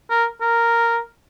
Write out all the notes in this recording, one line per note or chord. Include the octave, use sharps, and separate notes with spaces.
A#4
A#4